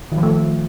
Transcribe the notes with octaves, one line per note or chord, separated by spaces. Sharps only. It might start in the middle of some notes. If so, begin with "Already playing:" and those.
D#3
F3
A3